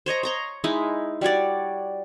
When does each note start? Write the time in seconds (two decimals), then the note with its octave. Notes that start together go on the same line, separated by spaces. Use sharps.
0.06 C5 C#5 D#5 A#5
0.23 C#5 A#5 C6
0.64 G#3 D#4 E4
1.21 G3 F#4 C#5 D5